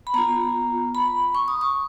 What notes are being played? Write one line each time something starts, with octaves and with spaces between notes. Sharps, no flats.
B5
B3 F4 A#5
B5
C#6
D#6
C#6